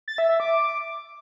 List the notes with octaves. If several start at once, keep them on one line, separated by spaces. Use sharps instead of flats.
A6
E5
E5
D6